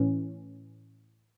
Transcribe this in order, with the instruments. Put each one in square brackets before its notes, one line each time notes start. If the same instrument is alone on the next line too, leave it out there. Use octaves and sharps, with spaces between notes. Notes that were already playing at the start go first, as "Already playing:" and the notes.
Already playing: [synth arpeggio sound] A2 E3 C#4